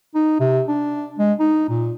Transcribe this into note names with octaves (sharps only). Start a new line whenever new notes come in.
D#4
C3
D4
G#3
D#4
A#2